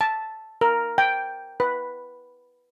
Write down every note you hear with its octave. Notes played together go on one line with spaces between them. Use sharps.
A5
A#4
G5
B4